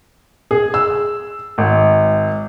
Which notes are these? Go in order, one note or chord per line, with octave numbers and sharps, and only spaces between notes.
G#4
E6
G#1